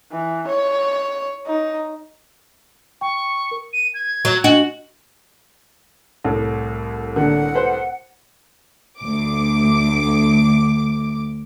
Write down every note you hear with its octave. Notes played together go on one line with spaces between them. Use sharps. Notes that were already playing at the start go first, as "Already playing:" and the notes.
E3
C#5
D#4
G5 C#6
A#4
D#7
G#6
F#3
D4 F#4 D#5 F#7
C2 A2
D3 A#3 F#5
B4 C5
D2 D6